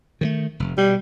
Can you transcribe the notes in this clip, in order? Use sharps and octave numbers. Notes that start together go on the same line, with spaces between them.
D#3 E3 A3
F1
B2 G3